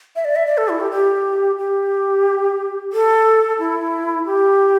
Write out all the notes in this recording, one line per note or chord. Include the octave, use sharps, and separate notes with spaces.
E5
D5
E5
D5
A4
E4
G4
G4
G4
A4
E4
G4